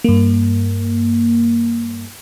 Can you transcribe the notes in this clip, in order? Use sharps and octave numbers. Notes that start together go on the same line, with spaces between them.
G2 A#3